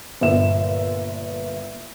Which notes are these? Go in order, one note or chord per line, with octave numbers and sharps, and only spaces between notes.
G1 A#2 E5 E7